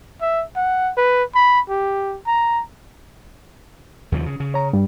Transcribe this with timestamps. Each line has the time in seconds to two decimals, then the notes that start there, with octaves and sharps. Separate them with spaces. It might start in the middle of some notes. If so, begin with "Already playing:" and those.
0.21 E5
0.56 F#5
0.97 B4
1.35 B5
1.69 G4
2.27 A#5
4.12 D#2 C#3 F3
4.26 C#3
4.40 C#3
4.54 C#5 A#5
4.73 G2 G3